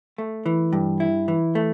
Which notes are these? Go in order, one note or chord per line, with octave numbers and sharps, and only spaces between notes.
A3
E3
G2
E4
E3
A3